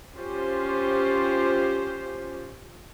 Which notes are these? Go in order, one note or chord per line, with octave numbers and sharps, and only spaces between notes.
C#4 F4 G4 C5